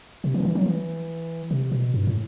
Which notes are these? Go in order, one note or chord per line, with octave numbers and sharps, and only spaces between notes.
C3
E3
D#3
E3
F#3
E3
C3
B2
G2
A2